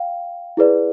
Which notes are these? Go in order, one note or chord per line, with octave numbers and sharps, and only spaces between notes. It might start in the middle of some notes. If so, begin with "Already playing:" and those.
Already playing: F5 G5
E4 G#4 B4 D5